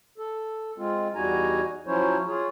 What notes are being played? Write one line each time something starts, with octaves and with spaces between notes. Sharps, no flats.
A4
G#3 C4 F4
E2 G3 D#4 F#4 G#5 A#5
F3 F#3 C#4 E4 C5 C#5
F4 G#4 C#5